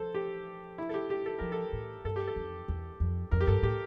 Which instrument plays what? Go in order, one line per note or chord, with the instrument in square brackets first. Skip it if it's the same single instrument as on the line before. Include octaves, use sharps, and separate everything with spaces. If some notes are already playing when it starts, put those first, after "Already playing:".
Already playing: [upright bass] F3 [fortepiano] A4 C5
[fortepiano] G4
E4
A4
G4
G4
A4
[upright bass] F3 [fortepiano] A#4
[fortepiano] A4
[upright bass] A2
[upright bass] G2 [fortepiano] A4
[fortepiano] G4
A4
[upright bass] F2
E2
F2
[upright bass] F2 [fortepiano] A#4
[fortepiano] G4
[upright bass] G2 [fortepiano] A4
[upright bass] A2 [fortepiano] G4